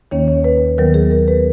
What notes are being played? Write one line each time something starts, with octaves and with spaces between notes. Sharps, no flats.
D#2 D#3 A#3 C#4 C#5
C#5
B4
D#2 D#3 F#3 B3 A#4
G#4
A#4
B4